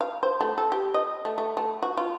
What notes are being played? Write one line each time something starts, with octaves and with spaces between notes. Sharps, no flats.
F5
C5
A3
A4
G4
D#5
A3
A3
A3
F#4
F4